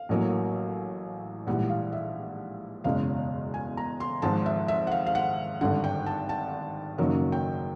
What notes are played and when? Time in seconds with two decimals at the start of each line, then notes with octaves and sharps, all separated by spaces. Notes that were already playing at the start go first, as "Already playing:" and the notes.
Already playing: F5
0.09 A1 A2 F#3 A#3
1.47 A#1 G#2 E3 G3 F#5
1.69 F5
1.92 E5
2.84 F#1 E2 B2 G#3 C#4 F5
3.54 G#5
3.77 A#5
4.00 C6
4.22 G#1 G#2 F3 G#3 C4 A5
4.46 E5
4.68 E5
4.87 F#5
4.91 F5
5.07 F5
5.15 F#5
5.61 G#1 G2 D3 F#5
5.84 G5
6.06 A5
6.29 A5
6.98 F#1 F#2 D#3 F#3 A#3
7.32 G5